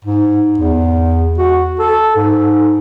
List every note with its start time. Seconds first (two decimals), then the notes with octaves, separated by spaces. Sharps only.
0.05 G#2
0.58 E2
1.38 F#4
1.79 A4
2.16 G#2